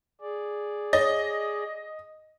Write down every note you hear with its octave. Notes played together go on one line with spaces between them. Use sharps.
G#4 D5
C#5 D#5